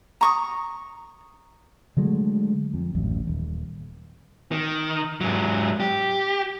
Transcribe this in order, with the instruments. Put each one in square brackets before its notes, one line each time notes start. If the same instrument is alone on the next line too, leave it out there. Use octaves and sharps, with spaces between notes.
[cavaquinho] A#5 C#6 D#6
[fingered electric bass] D3 F#3 G#3 A3
F2
D#1 A1 F#2
D#1
[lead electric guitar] D#3
G#2 F#3
G4